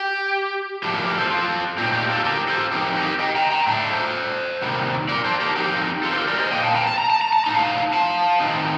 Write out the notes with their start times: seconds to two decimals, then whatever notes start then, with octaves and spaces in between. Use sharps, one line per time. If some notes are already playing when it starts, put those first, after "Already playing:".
Already playing: G4
0.83 A2 F3 A3 D4 G4
0.94 G4 A#4
1.06 G4 A#4
1.18 A4 C5
1.30 F4 A4
1.78 A#2 A3 C4 D#4 G4
1.93 G4
2.09 F4 A4
2.25 G4 A#4
2.48 A4 C5
2.72 F3 C4 D#4 G4 A#4
2.96 G4 A#4
3.20 D#5 G5
3.35 G5 A#5
3.51 G5 A#5
3.67 A2 A3 D4
3.90 A4 C5
4.62 C3 D#3 G3 A#3
5.09 A#4 D5
5.24 A4 C5
5.40 G4 A#4
5.56 F3 C4 D#4 G4 A#4
6.03 F4 A4
6.11 C5
6.15 G4 A#4
6.27 A#4 D5
6.39 C5 D#5
6.51 A#2 F3 A#3 D#5 G5
6.63 F5 A5
6.74 G5 A#5
6.87 A5
6.98 A#5
7.10 A5
7.21 A#5
7.33 A5
7.44 A2 A3 D#4 A#5
7.55 F5 A5
7.93 F5 A5
8.40 D#3 A3 C4 D#4